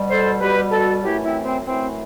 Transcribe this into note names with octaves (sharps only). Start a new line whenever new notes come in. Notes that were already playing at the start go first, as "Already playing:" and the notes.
Already playing: B2 G3
A4 C5
B2 G3 G4 B4
F#4 A4
F#2 E3 A3 E4 G4
C4 E4
C4
F#2 E3 A3 C4